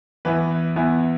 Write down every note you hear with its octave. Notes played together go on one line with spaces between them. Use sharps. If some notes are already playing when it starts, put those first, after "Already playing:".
E2 E3 B3 E4 B4
E2 E3 B3 E4